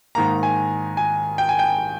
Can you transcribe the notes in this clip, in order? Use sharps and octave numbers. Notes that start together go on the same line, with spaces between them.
G#2 D#3 A#3 A#5
G#5
G#5
G5
G#5
G5